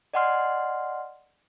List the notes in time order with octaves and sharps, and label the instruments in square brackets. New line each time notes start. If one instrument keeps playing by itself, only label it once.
[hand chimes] D5 D#5 F#5 G#5 C6 F6